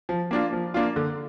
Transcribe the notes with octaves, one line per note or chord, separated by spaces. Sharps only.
F3
A#3 D4 F4
F3
A#3 D4 F4
D3